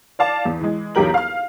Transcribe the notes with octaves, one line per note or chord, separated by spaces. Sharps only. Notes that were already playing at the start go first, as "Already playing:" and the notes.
D5 F5 A5 D6
E2
E3 G#3
B1 E2 F#3 G4 A#4 F#7
F5 F6